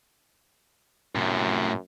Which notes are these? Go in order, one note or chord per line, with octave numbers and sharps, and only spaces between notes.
F#2 A2 C3